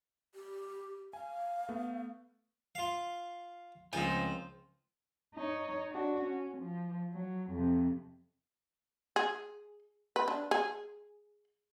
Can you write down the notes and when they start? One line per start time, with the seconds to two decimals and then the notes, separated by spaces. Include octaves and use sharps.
0.34 G4
1.13 F5 G#5
1.69 A3 B3
2.75 F4 F5
3.93 C#2 F3 C4 D#4 C5 G#5
5.35 D#4 C#5
5.92 D4 F#4
6.24 C#4
6.58 F3
7.13 F#3
7.51 F2 C3
9.16 G#4
10.16 B4
10.28 D4
10.51 G#4